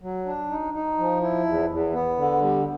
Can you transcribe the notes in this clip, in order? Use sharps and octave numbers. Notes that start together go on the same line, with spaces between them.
F#3
D4
D#4
D#4
F3
E4
E2
E2
B3
D3
G3